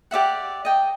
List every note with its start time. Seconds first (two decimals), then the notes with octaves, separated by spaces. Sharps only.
0.11 G4 D5 E5 F#5
0.65 D#5 G5